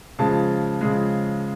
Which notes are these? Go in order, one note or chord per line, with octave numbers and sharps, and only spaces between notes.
C#3 F3 G#3 A5
C#3 F3 G#3